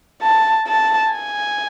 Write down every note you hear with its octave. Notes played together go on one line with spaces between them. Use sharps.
A5
A5
G#5